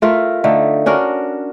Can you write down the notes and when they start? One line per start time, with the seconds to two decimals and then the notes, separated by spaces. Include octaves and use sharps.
0.02 A3 F4 A#4 E5
0.44 D3 A3 D#4
0.86 C#4 D4 F#4 A#4